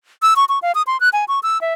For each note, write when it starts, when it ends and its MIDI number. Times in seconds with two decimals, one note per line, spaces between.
0.22 0.34 88
0.36 0.45 85
0.49 0.59 85
0.62 0.72 77
0.75 0.82 87
0.87 1.00 84
1.00 1.09 90
1.13 1.25 80
1.28 1.39 85
1.43 1.60 88
1.61 1.74 76